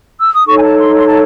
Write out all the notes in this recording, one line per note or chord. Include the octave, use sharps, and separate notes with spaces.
E6
D#6
D#4 A4 C#5 C#6
G#5
A5
C6
C6
A5